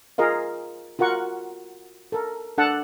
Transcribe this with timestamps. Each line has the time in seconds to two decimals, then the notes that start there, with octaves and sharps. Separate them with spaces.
0.18 F4 G#4 A#4 D#5 F5
0.99 F4 F#4 A#4 F#5 C#6
2.12 A4 A#4
2.58 D4 A4 F#5 A5